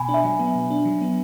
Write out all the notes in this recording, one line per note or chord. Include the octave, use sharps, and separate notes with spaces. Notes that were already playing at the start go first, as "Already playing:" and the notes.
Already playing: B2 G#5 B5
D4
E5 G#5
F#3
B3
B2
D4
F#3
B3